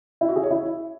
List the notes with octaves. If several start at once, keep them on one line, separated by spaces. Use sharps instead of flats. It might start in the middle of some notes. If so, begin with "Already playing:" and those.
E4
F#4
G#4
C#5
E4